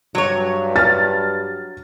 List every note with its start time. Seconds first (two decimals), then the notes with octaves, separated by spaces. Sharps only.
0.15 G2 F#3 C#5
0.76 F6 A6